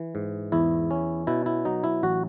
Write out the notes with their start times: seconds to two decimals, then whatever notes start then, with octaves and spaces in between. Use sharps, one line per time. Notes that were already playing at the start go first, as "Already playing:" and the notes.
Already playing: E3
0.15 G#2
0.52 E2 E4
0.91 C#4
1.27 B2 E4
1.46 E4
1.65 F#3 D#4
1.84 E4
2.03 A1 F#4